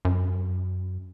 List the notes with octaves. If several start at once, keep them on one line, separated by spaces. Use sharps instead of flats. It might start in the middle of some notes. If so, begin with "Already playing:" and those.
F#2